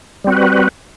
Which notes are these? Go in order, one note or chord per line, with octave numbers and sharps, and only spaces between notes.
G3 C4 F#4 B4